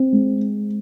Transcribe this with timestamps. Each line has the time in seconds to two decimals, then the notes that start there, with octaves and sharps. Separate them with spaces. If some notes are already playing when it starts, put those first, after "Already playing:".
Already playing: C4
0.13 G#3